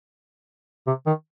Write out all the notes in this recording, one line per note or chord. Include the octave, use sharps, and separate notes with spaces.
C3
D#3